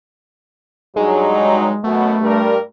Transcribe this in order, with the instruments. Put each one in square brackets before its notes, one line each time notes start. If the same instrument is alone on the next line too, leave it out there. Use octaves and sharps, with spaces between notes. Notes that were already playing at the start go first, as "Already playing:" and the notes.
[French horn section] G2 F#3 D#4 [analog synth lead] G#3
[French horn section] F#2 B2 [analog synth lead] A3
[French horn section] G2 G3 A#4